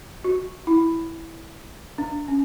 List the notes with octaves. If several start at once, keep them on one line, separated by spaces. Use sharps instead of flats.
F#4
E4
D4
C#4